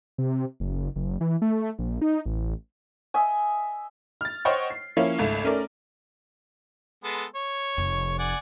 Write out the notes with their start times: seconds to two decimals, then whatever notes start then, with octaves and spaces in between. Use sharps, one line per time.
0.18 C3
0.60 F#1
0.96 F#1
1.21 E3
1.42 A3
1.79 A#1
2.02 D#4
2.26 A1
3.14 D#5 E5 G#5
4.21 F6 A6
4.45 C5 C#5 D#5 F#5 G5 C#6
4.70 C7
4.97 F3 A#3 C#4 E4 C#5 F5
5.19 G#1 C#2 A3
5.43 A3 C#4 A#4 D5
7.04 G#3 B3 A4
7.35 C#5
7.77 F1 F2
8.19 D5 F#5 G#5